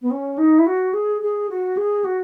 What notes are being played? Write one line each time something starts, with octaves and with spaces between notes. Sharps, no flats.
B3
C#4
D#4
E4
F#4
G#4
G#4
F#4
G#4
F#4